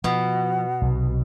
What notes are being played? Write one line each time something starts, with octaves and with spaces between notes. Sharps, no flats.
B2 F3 F#5
B1 C3